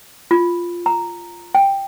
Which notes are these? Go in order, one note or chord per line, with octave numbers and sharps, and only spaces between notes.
F4
A#5
G5